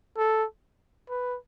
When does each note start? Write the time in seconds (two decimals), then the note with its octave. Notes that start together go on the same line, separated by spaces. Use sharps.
0.17 A4
1.09 B4